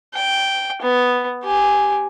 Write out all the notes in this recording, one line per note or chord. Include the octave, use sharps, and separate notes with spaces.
G5
B3
G4 G#5